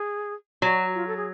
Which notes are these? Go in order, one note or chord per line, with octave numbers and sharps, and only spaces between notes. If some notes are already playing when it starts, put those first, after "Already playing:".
Already playing: G#4
F#3 F#4
F4
A4
G#4